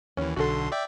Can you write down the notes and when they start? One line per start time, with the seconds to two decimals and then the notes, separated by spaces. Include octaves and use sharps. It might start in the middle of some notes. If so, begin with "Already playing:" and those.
0.17 D#2 E3 C#4
0.36 B1 D3 F#4 A4 C6
0.72 D5 E5 G5